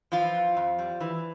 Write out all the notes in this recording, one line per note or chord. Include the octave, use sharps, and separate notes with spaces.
E3 F3 F4
F2
F2
G3
E3